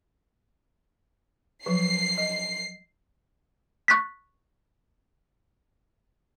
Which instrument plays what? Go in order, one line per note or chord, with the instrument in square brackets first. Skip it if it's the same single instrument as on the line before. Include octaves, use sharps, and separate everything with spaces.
[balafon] F3 F#3 [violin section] C7
[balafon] D#5
[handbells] C#6 F#6 A6 B6